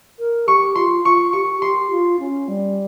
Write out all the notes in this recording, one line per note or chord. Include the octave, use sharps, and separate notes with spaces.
A#4
G4 C#6
F4 C6
F4 C#6
G4 C#6
G4 C6
F4
C#4
G3